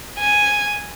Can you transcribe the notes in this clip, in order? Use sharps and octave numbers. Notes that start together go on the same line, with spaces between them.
G#5